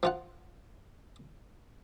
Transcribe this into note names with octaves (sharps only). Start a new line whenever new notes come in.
F3 F4 F#5